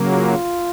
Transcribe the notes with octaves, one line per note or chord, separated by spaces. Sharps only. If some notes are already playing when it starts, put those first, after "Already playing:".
Already playing: C#3 F#3 A#3
F4